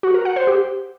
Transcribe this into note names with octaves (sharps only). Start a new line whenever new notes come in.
F#4
A#4
F#5
C5
G4